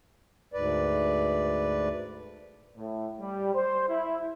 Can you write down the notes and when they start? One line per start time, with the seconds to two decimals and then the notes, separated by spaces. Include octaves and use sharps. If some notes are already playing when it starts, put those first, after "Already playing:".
0.54 D2 G#2 B4 D5
2.77 A2
3.20 G3
3.55 C5
3.89 E4